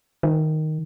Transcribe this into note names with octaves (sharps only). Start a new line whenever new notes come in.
D#3